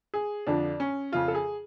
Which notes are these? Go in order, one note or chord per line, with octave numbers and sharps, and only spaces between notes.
G#4
F2 D3 F3 D4
C#4
F2 C#3 F3 F4
A4
G#4